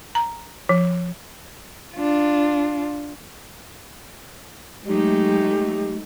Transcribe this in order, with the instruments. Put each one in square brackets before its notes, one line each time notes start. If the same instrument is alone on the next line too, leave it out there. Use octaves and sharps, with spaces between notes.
[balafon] A#5
F3
[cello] D4 F4
[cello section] F#3 A3 [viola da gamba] G#3 D#4 [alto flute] G4